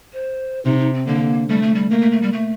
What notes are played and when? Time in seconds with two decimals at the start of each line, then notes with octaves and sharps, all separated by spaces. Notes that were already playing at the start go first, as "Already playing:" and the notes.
0.13 C5
0.65 C3 D#4
0.79 D#4
0.94 C4
1.07 D3 A#3
1.49 G3 A3
1.62 A3
1.75 G3
1.91 A3 A#3
2.01 A3
2.12 A3
2.22 G3
2.33 A3